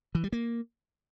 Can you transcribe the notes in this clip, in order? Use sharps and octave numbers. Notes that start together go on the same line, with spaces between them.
E3
G3
A#3